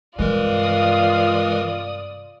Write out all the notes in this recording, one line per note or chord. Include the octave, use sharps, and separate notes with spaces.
G2 C3 E3 G#3 F4 A#4 D5 D#6